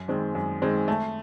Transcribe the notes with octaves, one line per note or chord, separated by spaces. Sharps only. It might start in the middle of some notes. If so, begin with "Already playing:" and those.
Already playing: F#2
D#3 G#3 C4
F#2
D#3 G#3 C4
A3